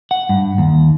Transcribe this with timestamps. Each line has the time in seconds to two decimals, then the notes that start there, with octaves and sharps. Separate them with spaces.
0.11 F#5
0.29 G2
0.58 D#2